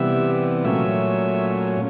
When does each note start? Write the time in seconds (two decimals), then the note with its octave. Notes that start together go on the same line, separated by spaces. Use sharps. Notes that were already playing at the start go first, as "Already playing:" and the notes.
Already playing: C3 E3 G3 B3 E5
0.65 A#2 F#3 A3 C#4 E5